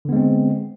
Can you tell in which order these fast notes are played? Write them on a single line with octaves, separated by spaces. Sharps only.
D3 B3 G#3 C4